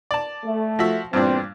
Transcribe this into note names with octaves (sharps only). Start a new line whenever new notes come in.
D5 A5
A3
F3 F#4 E5
E2 G2 A#2 C4 D4